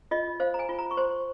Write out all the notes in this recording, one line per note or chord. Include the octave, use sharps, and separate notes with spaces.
F4 D#5
C5 F5
A#5
G#5
F4
A#5
C#6
C5 C6